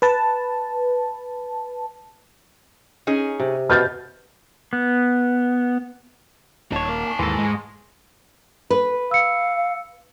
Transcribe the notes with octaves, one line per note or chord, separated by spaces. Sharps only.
B4 A5
C#4 D#4 G#4
C3
B2 B4 F6 G6 A6
B3
D#1 D#2 D#4 C#5 A5
A#3
G#5 C#6
D#2 G#2 E3 A4 C6 A#6
G#3
B4
F5 E6 C#7